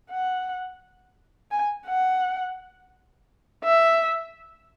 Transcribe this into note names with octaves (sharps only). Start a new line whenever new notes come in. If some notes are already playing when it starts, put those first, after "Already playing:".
F#5
G#5
F#5
E5